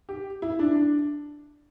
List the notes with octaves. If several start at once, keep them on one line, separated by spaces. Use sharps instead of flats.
G4
E4
D4
D4